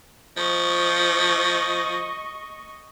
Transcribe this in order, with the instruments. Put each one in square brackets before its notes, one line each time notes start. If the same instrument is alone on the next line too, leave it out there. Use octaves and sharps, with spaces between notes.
[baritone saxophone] F3 [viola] D#5 C#6